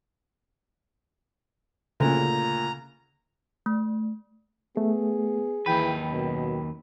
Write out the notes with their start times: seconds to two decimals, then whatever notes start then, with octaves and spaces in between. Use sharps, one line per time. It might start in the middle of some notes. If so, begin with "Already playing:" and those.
2.00 D2 A#2 C#3 A#5
3.66 A3
4.77 A3 B3 G#4
5.66 D#2 E3 B4 G5 B5
6.11 F#2 B2